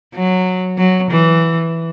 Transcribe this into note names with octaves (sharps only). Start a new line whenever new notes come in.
F#3
F#3
E3